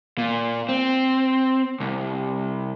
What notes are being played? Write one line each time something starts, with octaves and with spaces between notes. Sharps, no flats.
A#2
C4
C2